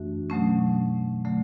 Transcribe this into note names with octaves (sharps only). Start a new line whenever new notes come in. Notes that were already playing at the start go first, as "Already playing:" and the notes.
Already playing: F#2 E3 A3 D4 F#4
B2 F#3 A3 C#4
D3 F#3 A3